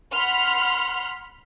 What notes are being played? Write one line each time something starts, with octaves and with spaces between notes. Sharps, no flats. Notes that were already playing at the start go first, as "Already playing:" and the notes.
F#5 B5 C6 F6